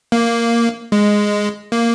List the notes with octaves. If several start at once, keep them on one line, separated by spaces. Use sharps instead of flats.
A#3
G#3
A#3